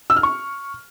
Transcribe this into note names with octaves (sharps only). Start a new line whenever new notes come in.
E6
F6
C#6